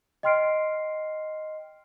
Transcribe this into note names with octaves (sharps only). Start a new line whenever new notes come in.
D#5 G5 C6 F6 C7 D7